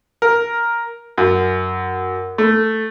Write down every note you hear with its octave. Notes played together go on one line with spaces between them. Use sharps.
A#4
F#2
A3